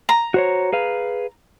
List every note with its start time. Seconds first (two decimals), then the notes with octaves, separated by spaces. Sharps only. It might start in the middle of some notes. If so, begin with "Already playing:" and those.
0.09 A#5
0.34 F#4 C5 C#5
0.73 G#4 B4 F5